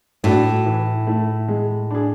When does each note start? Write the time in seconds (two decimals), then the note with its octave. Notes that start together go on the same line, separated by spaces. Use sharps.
0.24 A2 A3 D4 F#4
0.66 E3
1.07 A3 E4
1.48 G#3
1.91 D4 G#4